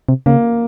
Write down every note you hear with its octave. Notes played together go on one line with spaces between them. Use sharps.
C3
C#3 A#3